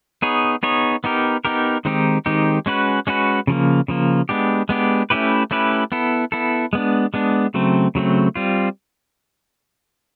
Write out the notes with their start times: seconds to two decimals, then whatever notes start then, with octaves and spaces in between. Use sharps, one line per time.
0.22 B3 D#4 G#4 C#5
0.63 B3 D#4 G#4 C#5
1.04 B3 D#4 G4 A#4
1.45 B3 D#4 G4 A#4
1.85 D#3 G#3 C4 D#4 G4
2.26 D#3 G#3 C4 D#4 G4
2.66 G#3 C#4 F#4 B4
3.07 G#3 C#4 F#4 B4
3.47 C#3 F3 A#3
3.88 C#3 F3 A#3
4.29 G#3 B3 D4 G4
4.69 G#3 B3 D4 G4
5.10 A3 C#4 E4 G4 B4
5.51 A3 C#4 E4 G4 B4
5.92 B3 E4 A4
6.32 B3 E4 A4
6.73 G#3 B3 D4
7.14 G#3 B3 D4
7.54 C#3 F#3 A3 C4
7.95 C#3 F#3 A3 C4
8.36 G3 C4 F4